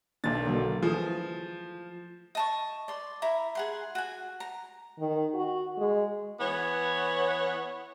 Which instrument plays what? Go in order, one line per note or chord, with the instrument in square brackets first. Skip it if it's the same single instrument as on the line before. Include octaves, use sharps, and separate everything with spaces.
[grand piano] B1 A6 [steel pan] D#3 A#3 D4
[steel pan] D3 F#3 A#3
[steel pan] E3 A3 G#4 [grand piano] F3
[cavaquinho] D#5 A5 C#6
D5 C6
E4 A#5
G#4 F#5 C6
F#4 G#5
A#5
[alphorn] D#3
F#4
G#3
[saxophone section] E3 B3 C#5